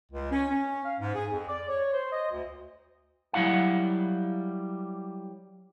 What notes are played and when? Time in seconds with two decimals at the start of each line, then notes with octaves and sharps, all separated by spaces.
0.12 C#2
0.32 C#4
0.49 C#4
0.85 F5
0.99 G#2
1.15 G#4
1.31 F2
1.48 D5
1.68 C#5
1.93 C5
2.12 D#5
2.31 D2
3.33 F#3 G3 E4 F5 F#5